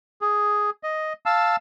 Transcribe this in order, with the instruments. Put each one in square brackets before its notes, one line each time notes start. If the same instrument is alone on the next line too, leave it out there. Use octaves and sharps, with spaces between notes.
[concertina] G#4
D#5
F5 A5 E6